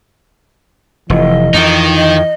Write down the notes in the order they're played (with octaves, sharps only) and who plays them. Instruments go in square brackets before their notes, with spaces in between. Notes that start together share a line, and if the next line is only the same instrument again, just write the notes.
[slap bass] F1 [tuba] E3 [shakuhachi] D#5
[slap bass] F2 [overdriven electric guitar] D#3 D#4
[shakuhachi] D#5